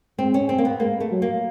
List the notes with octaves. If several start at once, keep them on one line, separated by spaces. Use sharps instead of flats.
G#3 C4
C#4
C4
A#3
B3
G#3 A#3
A3
F#3
A#3